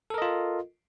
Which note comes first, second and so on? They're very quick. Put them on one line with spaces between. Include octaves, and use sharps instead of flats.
A4 A#4 D#5 F4